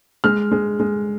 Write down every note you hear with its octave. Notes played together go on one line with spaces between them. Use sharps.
G#3 F6
G#3
G#3